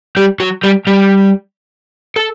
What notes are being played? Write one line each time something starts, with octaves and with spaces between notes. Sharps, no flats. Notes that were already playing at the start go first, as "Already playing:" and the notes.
G3 G4
F#3 F#4
G3 G4
G3 G4
A4